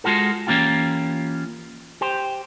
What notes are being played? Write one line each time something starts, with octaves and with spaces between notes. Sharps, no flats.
G#3 F4 F#4 A4
E3 A#3 C#4 F4 G4
G4 C5